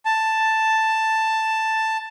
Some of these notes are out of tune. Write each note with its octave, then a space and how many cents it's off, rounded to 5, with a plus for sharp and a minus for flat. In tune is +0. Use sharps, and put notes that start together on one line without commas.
A5 +5